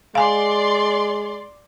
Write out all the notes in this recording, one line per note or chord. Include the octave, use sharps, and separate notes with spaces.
G#3 D5 F5 G#5 C6